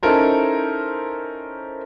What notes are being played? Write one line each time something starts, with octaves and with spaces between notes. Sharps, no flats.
C#4 D#4 E4 A4 A#4 C5